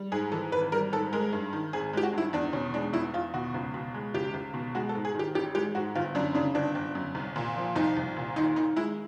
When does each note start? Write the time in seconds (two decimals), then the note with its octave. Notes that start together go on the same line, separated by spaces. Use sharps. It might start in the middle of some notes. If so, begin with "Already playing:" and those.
Already playing: G3
0.12 G#2 G#4
0.32 E3 A4
0.52 G#1 B4
0.72 G3 A#4
0.92 G#2 A4
1.13 G#3 A#4
1.33 G2
1.53 D#3
1.73 G#1 G#4
1.93 G#3 G4
2.03 F#4
2.13 G2 E4
2.33 E2 D4
2.53 B2 C#4
2.74 G#3 D4
2.93 E2 E4
3.14 E2 F4
3.34 B2 F#4
3.54 C#2
3.74 B2
3.94 G#3
4.14 C#2 G4
4.34 C#2
4.54 B2
4.75 G#3 F#4
4.89 A4
4.95 G#2
5.05 G#4
5.15 D#3 G4
5.35 A1 G4
5.55 G#3 G4
5.75 G#2 F#4
5.95 G1 F4
6.15 F#2 D4
6.35 C#3 D4
6.55 G1 D4
6.75 G1
6.95 F#2
7.15 C2
7.36 A#2
7.56 F3
7.76 C2 D#4
7.97 C2
8.17 A#2
8.36 D#2 D#4
8.56 D#3 D#4
8.76 G#3 E4